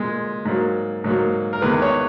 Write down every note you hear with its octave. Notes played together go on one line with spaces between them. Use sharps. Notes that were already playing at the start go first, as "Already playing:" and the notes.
Already playing: A#2 G#3
G#2 F#3 A#3
G#2 F#3 A#3
A#4
E2 D#3 G#3 B4
C#5